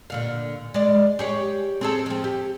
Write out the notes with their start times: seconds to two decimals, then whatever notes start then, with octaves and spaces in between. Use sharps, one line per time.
0.10 A#2 D3 F5
0.74 G#3 D5
1.19 G4 G#4 C#5
1.81 C4 G#4 A4
2.06 F3 C4
2.24 G4